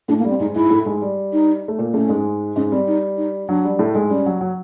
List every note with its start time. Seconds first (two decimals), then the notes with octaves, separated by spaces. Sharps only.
0.08 A2 A3 D4
0.19 A#3
0.25 G3
0.30 C4
0.40 G#2 G#3 D#4
0.56 G#2 G#3 E4
0.71 A2 A3
0.86 G#2 G#3
1.02 G3
1.33 D#4
1.68 A3
1.79 A#2 A#3
1.94 A2 A3 C#4
2.09 G#2 G#3
2.56 G#2 G#3 C#4
2.72 G3 C4
2.87 D#4
3.17 D#4
3.48 F#3 D4
3.64 G3
3.79 A2 A3
3.94 G#2 G#3
4.10 G3 C#4
4.26 F#3
4.41 F#3